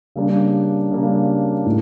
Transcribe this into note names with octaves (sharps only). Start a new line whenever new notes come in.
C#3 G3 A#3 D4
C#3 G3 A#3 D4
A2